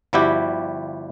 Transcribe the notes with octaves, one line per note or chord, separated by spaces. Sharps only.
G1 F3 G3 E4 F#4 G4